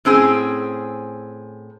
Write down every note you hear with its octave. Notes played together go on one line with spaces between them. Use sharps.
A2 C4 C#4 G#4